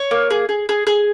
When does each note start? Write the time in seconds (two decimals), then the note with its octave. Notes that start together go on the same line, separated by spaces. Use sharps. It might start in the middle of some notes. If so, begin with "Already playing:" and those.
Already playing: C#5
0.11 A#3
0.30 G#4
0.49 G#4
0.69 G#4
0.87 G#4